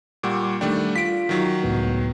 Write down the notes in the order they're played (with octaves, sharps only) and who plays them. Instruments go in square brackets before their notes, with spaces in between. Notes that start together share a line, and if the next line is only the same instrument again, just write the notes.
[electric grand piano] A#2 G3 [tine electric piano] F#5 C#6 D6
[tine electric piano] D#3 G5 [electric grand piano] G3 A3 D4
[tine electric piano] F4 [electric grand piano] B6 D7
[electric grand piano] D#3 F#3
[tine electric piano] C#2 A2 B3